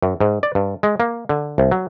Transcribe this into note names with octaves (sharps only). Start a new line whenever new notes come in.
F#2
G#2
D5
G2
G#3
A#3
D3
C2
F#3